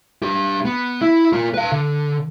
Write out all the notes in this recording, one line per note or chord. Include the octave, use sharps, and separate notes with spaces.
D4 G4
B3
E4
A#3 F4
B4 F5
D3